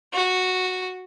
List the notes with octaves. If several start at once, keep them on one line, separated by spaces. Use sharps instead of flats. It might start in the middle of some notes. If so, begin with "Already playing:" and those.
F#4